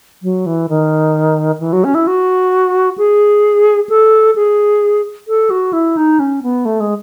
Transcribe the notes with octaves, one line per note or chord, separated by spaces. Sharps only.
F#3
E3
D#3
E3
F#3
C#4
E4
F#4
G#4
A4
G#4
A4
F#4
E4
D#4
C#4
B3
A3
G#3